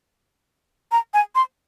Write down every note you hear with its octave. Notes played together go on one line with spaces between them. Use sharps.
A#5
G#5
C6